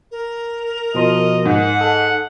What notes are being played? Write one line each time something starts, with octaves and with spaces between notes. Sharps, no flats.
A#4
B2 F3 D#5 C6
G#2 F#5
A4